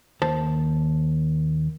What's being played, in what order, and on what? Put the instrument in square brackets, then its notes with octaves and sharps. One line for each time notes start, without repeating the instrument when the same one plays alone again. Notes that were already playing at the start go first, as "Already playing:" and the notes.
[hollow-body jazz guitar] D#2 C5 A5